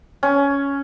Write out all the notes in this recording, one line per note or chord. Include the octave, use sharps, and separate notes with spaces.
C#4